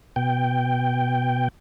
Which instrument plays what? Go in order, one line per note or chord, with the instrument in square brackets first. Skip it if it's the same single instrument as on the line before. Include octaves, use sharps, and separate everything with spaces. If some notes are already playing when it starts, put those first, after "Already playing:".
[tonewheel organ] B2 G5